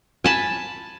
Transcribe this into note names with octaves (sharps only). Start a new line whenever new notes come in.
G#5 A5 B5